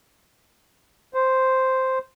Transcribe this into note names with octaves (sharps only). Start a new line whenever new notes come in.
C5